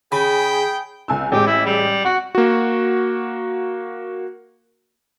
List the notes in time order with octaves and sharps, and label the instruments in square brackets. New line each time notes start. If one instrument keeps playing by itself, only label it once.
[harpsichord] C#3 [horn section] G#4 G5 [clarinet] B5
[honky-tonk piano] C#2 G#5 E6
[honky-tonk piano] A1 G#3 [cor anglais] G4
[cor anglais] E4
G3
[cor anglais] F#4 [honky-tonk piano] F#5
[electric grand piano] A#3 F#4